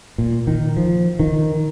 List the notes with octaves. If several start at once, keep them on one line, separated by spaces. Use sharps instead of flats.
A#2
D#3
F3
D#3